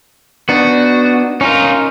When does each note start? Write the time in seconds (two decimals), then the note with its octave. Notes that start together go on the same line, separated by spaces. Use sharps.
0.49 B3 D4 D#4 F#4
1.41 C#4 D#4 F4 A#4